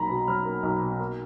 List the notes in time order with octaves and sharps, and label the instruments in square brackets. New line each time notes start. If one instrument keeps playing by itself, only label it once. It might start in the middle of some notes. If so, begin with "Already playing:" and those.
Already playing: [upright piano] B1 F#3 A#3 A#5 B5
B2
F#3 F6
A#3
B1
B2
A#3